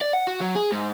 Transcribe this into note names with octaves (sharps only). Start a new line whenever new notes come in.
D5
F#5
F#4
F#3
G#4
G#2